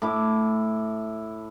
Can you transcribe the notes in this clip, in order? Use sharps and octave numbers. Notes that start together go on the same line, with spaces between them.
A2 E4 D6